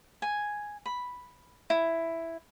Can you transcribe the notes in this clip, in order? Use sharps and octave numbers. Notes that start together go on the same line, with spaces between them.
G#5
B5
E4